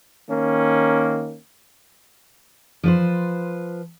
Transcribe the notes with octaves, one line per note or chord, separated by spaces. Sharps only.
D#3 A#3 C#4
F3 B4 C5